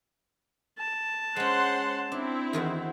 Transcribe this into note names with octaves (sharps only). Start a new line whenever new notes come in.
A5
G#3 C#4 C5 F#5 C6
C4 D4 E4
E2 D#3 F#4